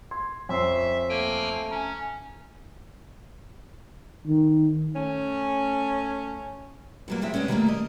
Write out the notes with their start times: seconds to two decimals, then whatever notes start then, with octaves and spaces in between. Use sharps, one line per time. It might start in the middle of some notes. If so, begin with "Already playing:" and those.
0.11 C6 G#6
0.49 F2 C#4 E5 C6 E6 C7
1.09 A3 A#3 G5 G#5
1.71 C#4 G#5 A#5
4.27 D#3
4.94 A3 C#4
7.08 G2 F#3 A#3
7.22 G3 G#3 C4 G4 E5
7.34 D3 G3 G#3 B3 C#4
7.48 D3 D#3 F#3 G3 A3 A#3
7.67 A#4 D#5